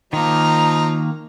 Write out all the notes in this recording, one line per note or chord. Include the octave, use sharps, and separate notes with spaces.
D#3 F3 A#3 D#4 A#5